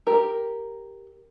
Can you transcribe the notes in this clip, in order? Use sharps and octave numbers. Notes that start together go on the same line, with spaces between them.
G4 A#4